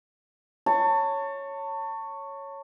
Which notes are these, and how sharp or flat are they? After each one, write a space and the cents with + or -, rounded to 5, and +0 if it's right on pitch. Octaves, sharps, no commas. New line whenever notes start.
C#5 +0 A5 +30